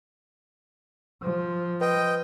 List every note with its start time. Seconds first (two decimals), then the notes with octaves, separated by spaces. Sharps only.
1.23 F3
1.81 B4 D#5 G5